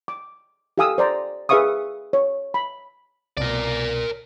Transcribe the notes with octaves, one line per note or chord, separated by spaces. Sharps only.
D6
G4 A4 F5 G#5 D#6 E6
C5 D5 A#5
G#4 B4 E5 F5 C#6 D#6
C#5
B5
C2 B2 A#4 D5